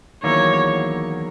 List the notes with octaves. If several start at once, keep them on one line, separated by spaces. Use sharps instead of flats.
E2 D#3 F#3 A#3 E4 C#5